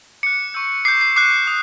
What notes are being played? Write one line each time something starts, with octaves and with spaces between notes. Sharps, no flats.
D6 F#6 C#7
C#6 E6 G6
D6 G6 C7
C7
D6 F#6 C7
D#6